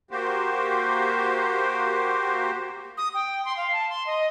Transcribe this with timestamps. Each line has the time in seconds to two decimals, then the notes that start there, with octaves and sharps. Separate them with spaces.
0.11 A#3 F#4 G4 C5
2.97 D#6
3.14 G5
3.45 C6
3.57 F5
3.73 A5
3.89 C6
4.06 D#5